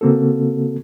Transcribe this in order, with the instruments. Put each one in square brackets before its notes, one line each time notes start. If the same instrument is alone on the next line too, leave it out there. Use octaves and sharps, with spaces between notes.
[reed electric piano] C#3 A#3 C4 F#4 A4